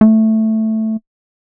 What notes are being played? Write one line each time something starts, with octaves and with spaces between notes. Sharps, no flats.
A3